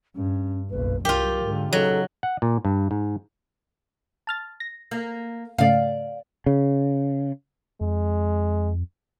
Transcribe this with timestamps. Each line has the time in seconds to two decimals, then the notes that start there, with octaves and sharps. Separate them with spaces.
0.15 G2 C#4
0.70 F#1 B1 B4
1.05 C2 F#3 F4 G4 A#4
1.43 G#2 D3
1.73 C#3 F#3 D#4 A4
2.23 F#5
2.42 A#2
2.65 G2
2.91 G#2
4.27 A5 F6 A6
4.60 A#6
4.91 A#3
5.58 G#2 C#3 A3 D5 F5
6.46 C#3
7.81 F2 G#3